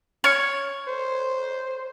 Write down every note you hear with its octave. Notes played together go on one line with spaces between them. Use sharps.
C#5 F6 G#6 C#7
C5